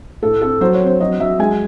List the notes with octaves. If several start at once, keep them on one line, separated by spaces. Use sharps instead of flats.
A2 A4
C4 A4
F#3 C5
C#5
C4
C5
F#3 D#5
F#3 E5
G#3 G#5